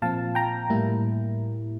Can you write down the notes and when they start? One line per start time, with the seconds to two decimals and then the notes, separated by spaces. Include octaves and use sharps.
0.02 A#2 F3 C4 F5 A5
0.35 G5 A#5
0.70 A2 G3 A#3 E4